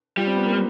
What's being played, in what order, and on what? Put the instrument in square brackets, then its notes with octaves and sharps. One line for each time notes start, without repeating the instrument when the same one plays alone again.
[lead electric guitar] G3 [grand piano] F4
[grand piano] C4
B3
A#3